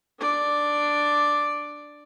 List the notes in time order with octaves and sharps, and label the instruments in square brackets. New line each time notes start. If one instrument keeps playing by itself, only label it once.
[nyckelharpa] D4 D5